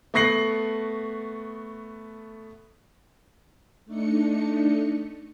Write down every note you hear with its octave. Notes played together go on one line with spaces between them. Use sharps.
A3 B3 C#6 A#6 C7 F#7
A3 D4 D#4 C#7